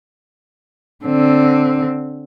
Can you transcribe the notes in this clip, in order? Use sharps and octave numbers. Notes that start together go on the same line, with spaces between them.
D3 C4